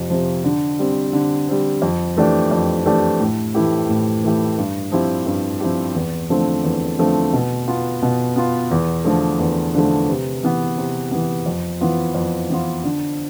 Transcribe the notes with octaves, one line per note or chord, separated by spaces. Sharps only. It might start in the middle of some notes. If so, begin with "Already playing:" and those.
Already playing: F2 C3
C3 F3
D3
G3 C4
D3
G3 C4
F2
E3 A3 D4 G4
F2
E3 A3 D4 G4
A2
E3 A3 E4 G4
A2
E3 A3 E4 G4
G2
F3 C4 E4 G4
G2
F3 C4 E4 G4
E2
D3 F3 A3 C4
E2
D3 F3 A3 C4
B2
B3 F4
B2
B3 F4
E2
D3 F3 A3
E2
D3 F3 A3
C3
E3 B3
C3
E3 B3
F2
E3 B3 F4
F2
E3 B3 F4
D3